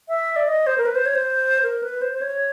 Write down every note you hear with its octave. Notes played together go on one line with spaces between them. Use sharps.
E5
D5
D#5
C5
A#4
B4
C5
C#5
C5
A#4
B4
C5
C5
C#5